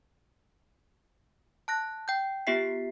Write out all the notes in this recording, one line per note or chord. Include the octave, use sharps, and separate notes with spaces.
A5 F#6 A#6
G5 G6
B3 F4 G4 E5 B6 C7